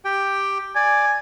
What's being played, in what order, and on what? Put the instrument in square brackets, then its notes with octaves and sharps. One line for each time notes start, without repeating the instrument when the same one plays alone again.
[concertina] G4 G5
[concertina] D5 [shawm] G#5